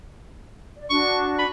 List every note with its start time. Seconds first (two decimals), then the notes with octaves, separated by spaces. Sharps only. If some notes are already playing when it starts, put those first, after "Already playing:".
0.76 D5
0.90 D4 F#4 C#6
1.39 B5